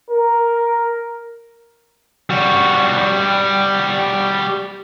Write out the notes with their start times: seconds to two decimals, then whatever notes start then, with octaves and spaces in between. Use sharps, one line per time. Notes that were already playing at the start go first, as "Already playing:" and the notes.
0.10 A#4
2.30 G3 F#4